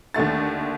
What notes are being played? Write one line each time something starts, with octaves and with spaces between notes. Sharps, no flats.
D#2 D3 A3 A6